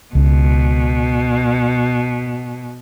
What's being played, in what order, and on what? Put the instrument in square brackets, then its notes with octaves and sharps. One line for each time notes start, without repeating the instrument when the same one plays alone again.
[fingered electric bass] C#2 [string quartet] B2